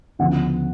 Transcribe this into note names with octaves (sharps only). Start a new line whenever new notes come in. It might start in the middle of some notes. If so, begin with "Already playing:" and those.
D2 C#3 F3 B3 F#5